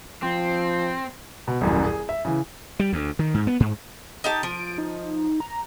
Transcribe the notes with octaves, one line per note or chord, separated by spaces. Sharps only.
F3 C4
B2
D#1 A1 F#2
G#4
E5
C#3 E3
G3
D2
D#3
G#2
B3
G#2
D#4 G4 A5
F3 D7
D#4
A#5